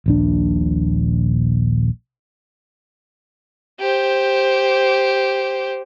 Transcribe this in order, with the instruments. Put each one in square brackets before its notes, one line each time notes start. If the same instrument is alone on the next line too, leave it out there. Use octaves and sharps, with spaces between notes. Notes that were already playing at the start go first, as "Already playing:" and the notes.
[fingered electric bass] D#1 A#1 D4
[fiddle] G4 C5